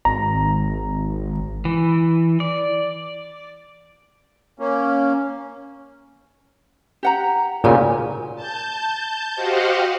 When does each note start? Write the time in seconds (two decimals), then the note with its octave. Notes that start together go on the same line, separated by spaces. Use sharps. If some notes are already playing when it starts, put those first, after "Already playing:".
0.05 G#1 A#5
1.65 E3
2.40 D5
4.60 A#3 C#4
7.03 G4 F#5 A#5
7.64 A#2 C#3 F#4 G4 G#5
8.36 A5 G6
9.36 F#4 G4 C5 D#5 F5 F#5